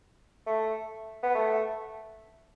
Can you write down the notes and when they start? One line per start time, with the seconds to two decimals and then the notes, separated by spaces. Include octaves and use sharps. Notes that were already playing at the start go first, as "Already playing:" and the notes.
0.46 A3
1.23 B3
1.35 A3